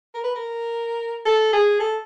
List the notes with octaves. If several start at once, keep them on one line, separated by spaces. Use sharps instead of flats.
A#4
B4
A#4
A4
G#4
A4